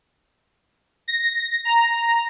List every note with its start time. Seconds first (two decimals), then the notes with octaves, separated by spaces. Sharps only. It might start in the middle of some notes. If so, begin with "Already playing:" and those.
1.08 A#6
1.65 A#5